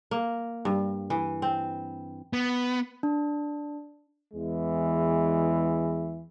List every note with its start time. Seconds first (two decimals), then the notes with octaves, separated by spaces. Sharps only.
0.11 A#3
0.65 G2
1.10 E3
1.42 C4
2.33 B3
3.03 D4
4.34 E2 E3 G#3